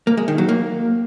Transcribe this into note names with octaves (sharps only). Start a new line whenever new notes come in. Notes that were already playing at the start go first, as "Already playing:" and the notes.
A#3
G#3
D#3
F#3
A#3